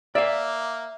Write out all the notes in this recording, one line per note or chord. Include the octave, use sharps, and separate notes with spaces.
A#3 D5 E5 F5